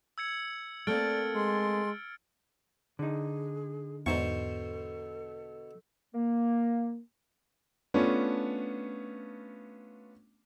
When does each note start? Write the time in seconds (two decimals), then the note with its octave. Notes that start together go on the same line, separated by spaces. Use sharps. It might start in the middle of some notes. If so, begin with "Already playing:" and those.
0.18 E6 G#6 C#7
0.87 A3 A#3 C4 D5 F6 A6 D7
1.35 G#3 C6
2.99 D3 D#4 G#4
4.06 E2 G#2 B2 A4 C5 C#6
6.15 A#3
7.94 A3 B3 C#4 D4 F4